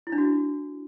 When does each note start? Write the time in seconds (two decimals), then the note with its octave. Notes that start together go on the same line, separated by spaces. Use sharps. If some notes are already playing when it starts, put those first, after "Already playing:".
0.07 E4
0.12 D4
0.18 F#4